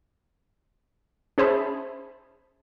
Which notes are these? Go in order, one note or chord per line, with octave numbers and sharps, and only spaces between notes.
C#4 G#4 C5 E5 A5 B5